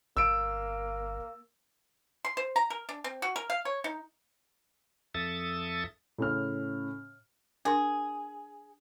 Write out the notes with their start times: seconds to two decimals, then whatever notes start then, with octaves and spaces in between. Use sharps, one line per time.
0.17 G1 A#3 E6 D7
2.25 C6
2.37 C5
2.56 A#5
2.70 A#4
2.89 D4
3.04 C4
3.22 F#4
3.36 A#4
3.50 F5
3.65 C#5
3.84 D#4
5.14 F2 A4 E5 D#6 A6
6.18 A2 C#3 F6
7.65 D4 G#4 A#4 C6